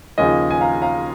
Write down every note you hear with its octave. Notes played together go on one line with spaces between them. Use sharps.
D#2 C#3 F3 D#5 G#5
G#5
F5 A#5
F5 A#5